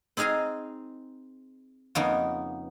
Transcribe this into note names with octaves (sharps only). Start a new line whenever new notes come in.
C4 D#4 G#4 F5 G#5 A#5
F2 C#3 A#3 B3 D#4